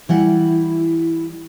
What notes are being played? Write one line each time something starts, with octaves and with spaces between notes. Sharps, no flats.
E3 G3 E4 F#5